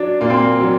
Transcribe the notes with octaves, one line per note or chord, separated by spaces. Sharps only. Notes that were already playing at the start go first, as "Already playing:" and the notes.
Already playing: F#3 D4 F#4
A#2 A#3
C4
A#3
F#3